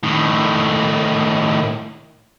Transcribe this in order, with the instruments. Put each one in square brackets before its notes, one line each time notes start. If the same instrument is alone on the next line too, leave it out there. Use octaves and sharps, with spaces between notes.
[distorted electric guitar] A2 D#3